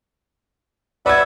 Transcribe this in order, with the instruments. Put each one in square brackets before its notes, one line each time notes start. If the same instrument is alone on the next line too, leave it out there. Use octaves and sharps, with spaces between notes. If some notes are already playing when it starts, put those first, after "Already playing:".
[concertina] B4 E5 F#5 [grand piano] D5 E6 G#6